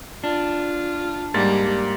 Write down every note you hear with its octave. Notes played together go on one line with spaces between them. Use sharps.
D4 F4
G#2 G3 A#3 A6